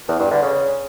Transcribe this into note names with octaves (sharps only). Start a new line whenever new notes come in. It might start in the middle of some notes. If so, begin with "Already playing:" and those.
E2
G2
D3
C#3